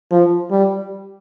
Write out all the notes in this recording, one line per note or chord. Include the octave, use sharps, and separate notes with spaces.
F3
G3